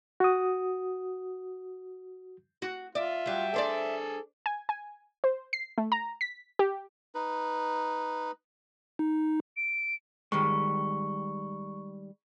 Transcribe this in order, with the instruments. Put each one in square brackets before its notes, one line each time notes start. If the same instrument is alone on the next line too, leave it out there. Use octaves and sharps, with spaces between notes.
[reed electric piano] F#4 D#6
[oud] F#4
[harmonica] F4 [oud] D5 [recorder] E5
[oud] F#3 G3
[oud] D4 C5 D5 [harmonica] G#4 A4
[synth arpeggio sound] G#5
G#5
C5
C7
A3
A#5
B6
G4
[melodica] D#4 B4
[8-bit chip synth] D#4
[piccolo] D7
[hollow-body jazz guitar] D#3 G3 G#3 [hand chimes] C#6